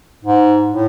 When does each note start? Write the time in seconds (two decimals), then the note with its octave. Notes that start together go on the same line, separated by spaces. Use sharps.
0.25 G#2
0.72 A2